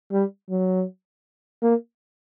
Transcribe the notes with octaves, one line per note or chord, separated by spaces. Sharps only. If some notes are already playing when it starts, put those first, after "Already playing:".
G3
F#3
A#3